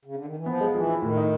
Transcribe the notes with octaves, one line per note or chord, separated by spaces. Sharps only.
C#3
D3
D#3
E3
F3 B3
G#3
E3 F3
E4
A2 D#3
D#4